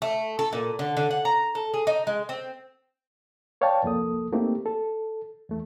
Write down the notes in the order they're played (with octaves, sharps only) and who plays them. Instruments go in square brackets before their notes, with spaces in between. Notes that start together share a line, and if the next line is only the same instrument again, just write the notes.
[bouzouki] A3
A4
A#2
D3
D3
F#5
A#5
A4
G#4
D#4
G#3
C4
[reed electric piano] B4 C#5 D5 F5 G5 A5
C2 F2 A#3 A4 D#6
A3 A#3 C4 D#4 G4
A4
E2 A3